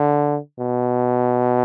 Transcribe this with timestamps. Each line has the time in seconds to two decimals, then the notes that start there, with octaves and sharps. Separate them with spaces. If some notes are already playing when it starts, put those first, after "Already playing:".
Already playing: D3
0.59 B2